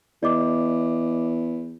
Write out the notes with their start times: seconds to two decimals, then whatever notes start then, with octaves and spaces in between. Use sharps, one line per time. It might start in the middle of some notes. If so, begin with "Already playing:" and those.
0.23 E2 D5 D#5 D6